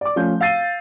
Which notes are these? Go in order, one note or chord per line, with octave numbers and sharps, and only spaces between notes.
D5 D6
F3 A3 C#4 G6
F5 E6 A6 C7 D#7